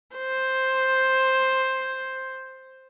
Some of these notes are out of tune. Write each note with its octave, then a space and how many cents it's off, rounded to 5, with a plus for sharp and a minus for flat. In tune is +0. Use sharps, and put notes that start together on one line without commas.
C5 +5